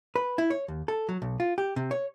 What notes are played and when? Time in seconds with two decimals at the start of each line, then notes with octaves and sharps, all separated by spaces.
0.16 B4
0.38 E4
0.50 C#5
0.68 D#2
0.88 A4
1.09 F#3
1.22 B1
1.40 F4
1.58 G4
1.76 C3
1.91 C#5